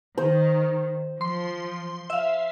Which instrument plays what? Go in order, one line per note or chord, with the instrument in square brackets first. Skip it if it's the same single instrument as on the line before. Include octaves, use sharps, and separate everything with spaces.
[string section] D#3 [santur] C5
[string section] F3 [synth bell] C6
[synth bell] E5 F5